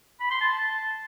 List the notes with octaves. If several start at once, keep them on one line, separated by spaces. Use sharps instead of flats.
B5
C6
A5